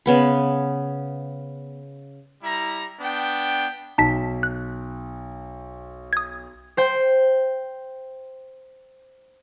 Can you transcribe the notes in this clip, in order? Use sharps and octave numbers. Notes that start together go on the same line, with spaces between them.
C#3 B3 B5
G3 E4 A#5
B3 D4 G5
B1 D#4 A5 B6
F#6
D#6 G#6
C5 G5